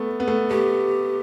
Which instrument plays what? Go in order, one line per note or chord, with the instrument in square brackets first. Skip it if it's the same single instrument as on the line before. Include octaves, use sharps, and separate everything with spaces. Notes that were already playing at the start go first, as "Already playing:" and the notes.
Already playing: [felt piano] A3 B3
B3
A3
[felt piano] A3 [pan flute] G4